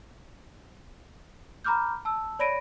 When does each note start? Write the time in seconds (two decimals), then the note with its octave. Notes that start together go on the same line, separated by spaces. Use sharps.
1.64 A#5 B5 D6 F6 G6
2.05 A5 E6
2.39 C#5 D5 B5 A#6 D7 D#7